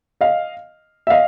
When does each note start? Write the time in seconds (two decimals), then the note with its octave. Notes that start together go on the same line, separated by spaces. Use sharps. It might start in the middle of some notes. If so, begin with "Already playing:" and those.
0.21 D#5 F5
1.07 E5
1.10 D#5 F5